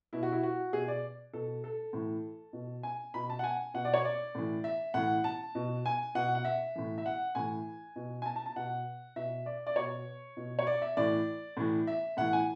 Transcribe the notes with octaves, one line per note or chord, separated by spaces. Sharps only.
B2 E4
F#4
E4
F#4
B2 G#4
D5
B2 A4
A4
A2 E3
B2
G#5
B2 B5
A5
F#5
G#5
B2 F#5
D5
C#5
D5
A2 E3
E5
A2 E3 F#5
A5
B2
G#5
B2 F#5
F#5
E5
A2 E3
E5
F#5
A2 E3 G#5
B2
G#5
A5
A5
A5
B2 F#5
B2 E5
D5
D5
B2 C#5
B2
C#5
D5
E5
A2 E3 D5
A2 E3
E5
A2 E3 F#5
G#5